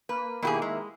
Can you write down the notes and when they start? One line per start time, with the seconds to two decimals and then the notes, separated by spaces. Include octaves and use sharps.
0.09 A#3 B4
0.42 B2 D#3 A#3 E4 G4 G#4
0.62 G#3